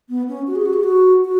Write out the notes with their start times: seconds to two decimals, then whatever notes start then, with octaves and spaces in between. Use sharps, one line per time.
0.09 B3
0.28 C#4
0.47 F#4
0.55 G#4
0.66 F#4
0.73 G#4
0.83 F#4
1.24 F#4